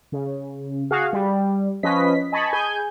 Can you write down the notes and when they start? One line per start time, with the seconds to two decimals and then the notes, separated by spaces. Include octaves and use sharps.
0.12 C#3
0.91 F#4 G#4 F5
1.13 G3
1.83 F3 C#4 B4 D#5 B6
2.32 D#5 G#5 A5 B5 C#6
2.53 G#4 G#5 G6